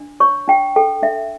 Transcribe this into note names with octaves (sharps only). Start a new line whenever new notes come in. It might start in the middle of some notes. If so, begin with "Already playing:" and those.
Already playing: D4
C#5 C#6
D4 G5
A4 G5
D4 E5